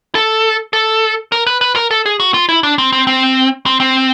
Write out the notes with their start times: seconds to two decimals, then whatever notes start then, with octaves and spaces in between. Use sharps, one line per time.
0.15 A4
0.73 A4
1.32 A#4
1.46 B4
1.61 B4
1.76 A#4
1.91 A4
2.06 G#4
2.20 F#4
2.34 F4
2.49 E4
2.63 D4
2.78 C4
2.92 C4
3.07 C4
3.66 C4
3.80 C4